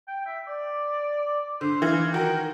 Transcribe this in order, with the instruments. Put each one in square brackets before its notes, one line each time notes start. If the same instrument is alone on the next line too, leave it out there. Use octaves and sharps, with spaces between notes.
[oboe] G5
E5
D5
[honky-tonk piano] D3 [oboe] C5
[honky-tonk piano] E3 [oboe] F5
[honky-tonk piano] D#3 F#4 A#4 [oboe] G5